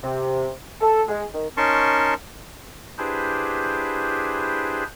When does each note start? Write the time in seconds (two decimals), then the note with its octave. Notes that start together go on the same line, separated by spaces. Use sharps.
0.03 C3
0.81 A4
1.08 G#3
1.34 D#3
1.57 C#4 D#4 A#4 A5 C6 C#6
2.98 D4 E4 G4 G#4 B4 C5